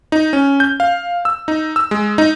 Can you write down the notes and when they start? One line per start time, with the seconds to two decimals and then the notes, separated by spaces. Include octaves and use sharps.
0.12 D#4
0.33 C#4
0.60 G6
0.80 F5
1.25 E6
1.48 D#4
1.76 E6
1.91 G#3
2.18 D#4